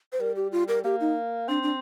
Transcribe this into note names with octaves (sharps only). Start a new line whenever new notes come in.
C5
G3 A#4
G4
F4
A#4
A#3 G4
D#4
C4 D4
D4